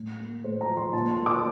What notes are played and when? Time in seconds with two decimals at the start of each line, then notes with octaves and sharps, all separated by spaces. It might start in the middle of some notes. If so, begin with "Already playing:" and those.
Already playing: A2
0.20 A#3
0.44 A2 C5
0.61 A#5
0.69 F3
0.77 C6
0.93 A#2 A5
1.11 C6
1.18 A#3
1.26 D6